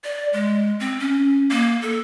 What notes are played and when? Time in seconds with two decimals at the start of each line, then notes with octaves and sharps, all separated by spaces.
0.04 D5
0.33 G#3
0.80 C4
0.99 C#4
1.51 A#3
1.82 A4